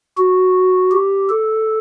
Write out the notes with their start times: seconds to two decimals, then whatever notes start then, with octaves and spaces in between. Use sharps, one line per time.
0.17 F#4
0.92 G4
1.29 A4